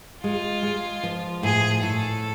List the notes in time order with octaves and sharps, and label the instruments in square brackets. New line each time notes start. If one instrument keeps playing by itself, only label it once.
[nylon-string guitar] G#3 [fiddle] F4
[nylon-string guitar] G#3
F3
[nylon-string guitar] A2 [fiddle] G#4
[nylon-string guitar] A2 [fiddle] A4